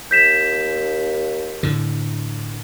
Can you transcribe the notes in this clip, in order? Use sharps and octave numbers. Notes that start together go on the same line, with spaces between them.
D#2 G6 B6 E7
A2 D3